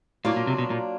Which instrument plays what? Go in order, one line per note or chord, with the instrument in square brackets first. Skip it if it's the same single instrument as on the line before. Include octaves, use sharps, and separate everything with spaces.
[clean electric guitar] A2 [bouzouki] F#3 A#3 D4 F4
[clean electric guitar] A#2
C3
B2
A#2